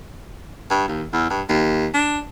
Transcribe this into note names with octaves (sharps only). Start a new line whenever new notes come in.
G2
D#2
E2
G2
D#2
D4